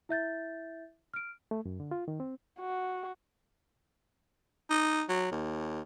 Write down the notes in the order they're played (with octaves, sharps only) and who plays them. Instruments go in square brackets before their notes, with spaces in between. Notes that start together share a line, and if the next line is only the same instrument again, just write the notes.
[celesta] E4 E5 G6 A6
F6 D7
[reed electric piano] A3
F#2
D3
F4
D#3
C4
[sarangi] F#4
[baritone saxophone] D#4
F#3
D#2